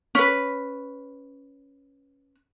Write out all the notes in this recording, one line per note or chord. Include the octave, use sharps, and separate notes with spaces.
C#4 B4